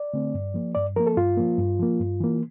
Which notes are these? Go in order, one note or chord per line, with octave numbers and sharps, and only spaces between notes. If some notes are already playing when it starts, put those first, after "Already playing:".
Already playing: D5
D3 A3 C4
G2
F3 A#3
G2 D5
F3 A#3 A#4
A4
G2 F4
F3 A#3
G2
F3 A#3
G2
E3 A#3